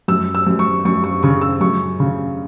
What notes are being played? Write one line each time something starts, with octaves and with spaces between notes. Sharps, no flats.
F#2 E6
E6
F#2
C#6
F#2 C#6
C#6
C#3 C#6
E6
F#2 C#6
C#3